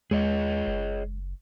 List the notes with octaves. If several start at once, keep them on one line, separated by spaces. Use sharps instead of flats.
D#2 G#3 G#4 C#5 D#5
F#1